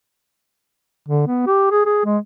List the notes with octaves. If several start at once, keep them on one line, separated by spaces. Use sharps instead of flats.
D3
B3
G4
G#4
G#4
G#3